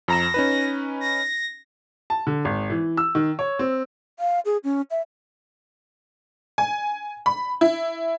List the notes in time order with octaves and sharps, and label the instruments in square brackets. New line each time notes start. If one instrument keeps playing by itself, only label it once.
[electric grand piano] F2 A#5 E7 [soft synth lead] A#6
[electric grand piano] C#4 D#4 B4
[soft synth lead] A#6
[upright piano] A5
D3
G#1
E3
E6
D#3
C#5
C4
[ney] F5
G#4
C#4
E5
[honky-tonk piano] G#5
B5
E4